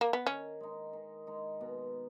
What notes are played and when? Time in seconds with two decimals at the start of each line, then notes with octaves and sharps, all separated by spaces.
0.01 A#3
0.13 B3
0.26 D#3 C#4
0.60 G#3 D#4
0.93 D#3
1.27 G#3 D#4
1.61 B2